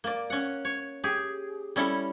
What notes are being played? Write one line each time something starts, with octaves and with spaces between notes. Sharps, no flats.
A#3 D5
C#4 F#5
C#5
G4 G#4
G3 C#4 E4 A4